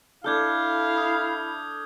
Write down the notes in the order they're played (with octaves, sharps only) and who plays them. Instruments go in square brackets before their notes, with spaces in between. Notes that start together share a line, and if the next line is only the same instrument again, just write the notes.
[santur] D4 A4 [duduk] E4 [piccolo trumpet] F5 [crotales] F6 G6 G#6
[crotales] D#6